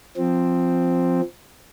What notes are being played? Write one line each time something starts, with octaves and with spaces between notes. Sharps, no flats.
F3 C4